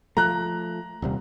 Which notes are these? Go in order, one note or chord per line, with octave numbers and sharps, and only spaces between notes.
F3 A3 A#5 F#6
D#1 C3 G3